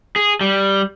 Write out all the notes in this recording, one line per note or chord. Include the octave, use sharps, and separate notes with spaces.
G#4
G3